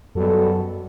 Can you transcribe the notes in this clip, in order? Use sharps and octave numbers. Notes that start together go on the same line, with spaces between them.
F#2 B2 G3 B3 F#4 A4